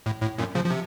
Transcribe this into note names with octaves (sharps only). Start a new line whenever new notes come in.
A2
A2
F#2 A#2
C#3 F3
F3
C3